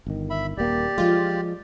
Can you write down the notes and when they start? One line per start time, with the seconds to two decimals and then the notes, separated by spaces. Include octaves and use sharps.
0.07 G1 D#3
0.30 E5 B5
0.57 D#1 A#3 G4 D5
0.98 F3 G#3 F4